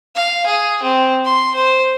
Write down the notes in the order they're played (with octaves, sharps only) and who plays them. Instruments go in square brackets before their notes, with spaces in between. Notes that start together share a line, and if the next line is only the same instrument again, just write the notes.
[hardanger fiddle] F5
G#4
C4
C6
C5